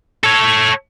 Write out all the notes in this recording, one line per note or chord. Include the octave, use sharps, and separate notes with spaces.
A4 C#5